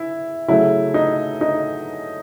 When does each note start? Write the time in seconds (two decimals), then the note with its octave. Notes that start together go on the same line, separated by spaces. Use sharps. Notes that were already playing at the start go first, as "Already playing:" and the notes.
Already playing: E4
0.48 C#3 F#3 A3 E4
0.94 D#4
1.41 D#4